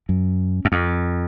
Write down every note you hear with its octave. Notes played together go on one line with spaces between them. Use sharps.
F#2
F#2
F2